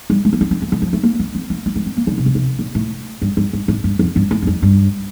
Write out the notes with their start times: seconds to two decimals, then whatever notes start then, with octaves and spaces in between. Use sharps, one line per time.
0.10 G3
0.25 A3
0.33 A#3
0.41 C4
0.51 C4
0.62 A#3
0.72 D#3
0.82 F3
0.93 A3
1.03 A#3
1.19 A#3
1.35 C4
1.50 A#3
1.66 A#3
1.76 A3
1.86 C4
1.97 A#3
2.07 D3
2.18 C3
2.26 D3
2.35 C3
2.59 A#2
2.75 A2
3.22 G2
3.37 G2
3.53 G2
3.68 A2
3.84 G2
3.99 F2
4.16 G2
4.31 A2
4.42 G2
4.47 F2
4.62 G2